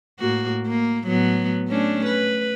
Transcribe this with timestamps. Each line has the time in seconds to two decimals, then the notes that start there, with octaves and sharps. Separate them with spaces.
0.19 A2 A#3 F#4
0.67 A#3
1.07 A2 F#3 B3
1.68 A3 C#4 D4
2.06 B4